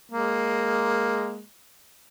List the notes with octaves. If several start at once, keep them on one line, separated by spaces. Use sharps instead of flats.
G#3 A#3